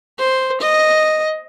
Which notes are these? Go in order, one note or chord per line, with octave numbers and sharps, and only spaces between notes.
C5
D#5